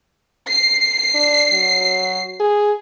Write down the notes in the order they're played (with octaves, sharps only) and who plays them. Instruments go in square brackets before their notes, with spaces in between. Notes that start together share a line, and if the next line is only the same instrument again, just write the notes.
[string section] C7
[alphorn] D4
F#3
G#4